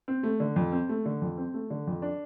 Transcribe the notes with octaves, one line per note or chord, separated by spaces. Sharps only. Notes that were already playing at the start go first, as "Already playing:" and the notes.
C4
A3
D3
F2
C4
A3
D3
F2
C4
A3
D3
F2
D4